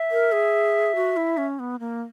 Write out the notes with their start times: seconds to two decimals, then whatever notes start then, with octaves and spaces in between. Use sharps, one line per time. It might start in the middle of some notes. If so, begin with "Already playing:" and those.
Already playing: E5
0.11 A#4
0.32 G#4
0.95 F#4
1.17 E4
1.37 C#4
1.59 B3
1.79 A#3